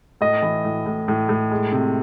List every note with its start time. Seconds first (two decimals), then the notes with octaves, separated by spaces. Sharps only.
0.21 A2 D#5
0.42 E3
0.65 A2
0.86 A2
1.08 A2
1.29 A2
1.51 G#3
1.72 C3